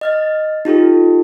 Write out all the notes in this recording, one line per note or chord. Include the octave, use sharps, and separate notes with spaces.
D#5 F6 A6
D#4 F4 G4 A4